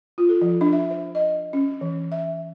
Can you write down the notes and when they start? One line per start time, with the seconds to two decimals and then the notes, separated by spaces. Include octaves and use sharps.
0.18 F4
0.29 A4
0.42 F3
0.61 D4
0.73 E5
0.90 C5
1.15 D#5
1.53 C#4
1.81 E3
2.12 E5